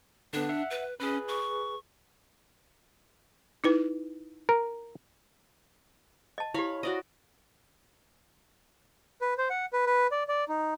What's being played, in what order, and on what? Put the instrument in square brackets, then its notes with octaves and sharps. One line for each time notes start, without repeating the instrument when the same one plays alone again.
[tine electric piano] D3 B3 [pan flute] D4
[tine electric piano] E5 F#5
[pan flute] B4
[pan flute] C#4 [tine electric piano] G#4 B4
[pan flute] C#6
[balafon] D#4 E4 B4
[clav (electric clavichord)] A#4
[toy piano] D#5 A5
[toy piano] E4 G4 [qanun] C#5 F5 B5
[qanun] F#4 D5 D#5
[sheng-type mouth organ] B4
C5
F#5
B4
B4
D5
D5
D#4